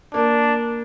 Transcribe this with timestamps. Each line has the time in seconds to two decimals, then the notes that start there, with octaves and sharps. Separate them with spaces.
0.14 A#3 D4